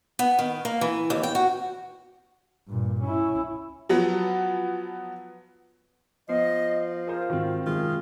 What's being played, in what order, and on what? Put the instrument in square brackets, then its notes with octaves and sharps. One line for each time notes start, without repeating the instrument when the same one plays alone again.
[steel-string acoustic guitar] B3
D#3
A#3
E3
D#2
G5
F#4
[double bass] G2 A#2
C#4 E4
[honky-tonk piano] F3 F#3 B3
[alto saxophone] F3 [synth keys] B3 C7 [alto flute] D#5
[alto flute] F4 [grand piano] G#4 A#4 C5
[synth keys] G#2 F#4 [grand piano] D#3 C4
[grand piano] F#2 C3 D#3 [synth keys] G#3 [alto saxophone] F4 [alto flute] G#4